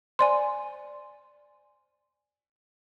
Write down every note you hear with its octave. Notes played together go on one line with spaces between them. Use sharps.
C5 D5 G#5 C6